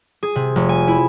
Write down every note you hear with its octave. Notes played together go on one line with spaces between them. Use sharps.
G#4
C3
F1
G#5
E4